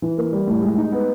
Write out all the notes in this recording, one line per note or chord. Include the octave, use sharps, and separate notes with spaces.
E3
A#3
G3
A2
G#3
D#4
B3